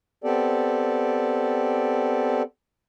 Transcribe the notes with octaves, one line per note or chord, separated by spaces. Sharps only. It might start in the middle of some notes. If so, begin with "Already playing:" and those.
B3 C4 G4 A4 D5